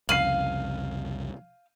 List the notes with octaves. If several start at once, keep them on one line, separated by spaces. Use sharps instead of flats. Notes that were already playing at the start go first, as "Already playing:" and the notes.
C2 F2 C#3 F5 C7 D#7 F#7